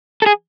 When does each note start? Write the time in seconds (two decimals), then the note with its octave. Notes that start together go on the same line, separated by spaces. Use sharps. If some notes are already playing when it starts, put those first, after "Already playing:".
0.22 A4
0.26 G#4